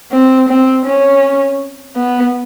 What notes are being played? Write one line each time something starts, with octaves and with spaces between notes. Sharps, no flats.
C4
C4
C#4
B3